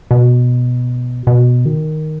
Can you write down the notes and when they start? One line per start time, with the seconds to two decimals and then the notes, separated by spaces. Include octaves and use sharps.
0.11 B2
1.27 B2
1.65 D#3